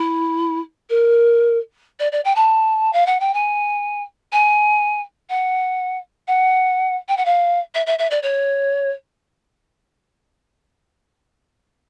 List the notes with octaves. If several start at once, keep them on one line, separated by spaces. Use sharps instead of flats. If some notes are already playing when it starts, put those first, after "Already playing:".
Already playing: E4
A#4
D5
D5
G5
A5
F5
F#5
G5
G#5
G#5
F#5
F#5
G5
F#5
F5
E5
E5
E5
D5
C#5